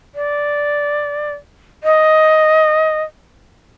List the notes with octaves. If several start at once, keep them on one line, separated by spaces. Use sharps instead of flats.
D5
D#5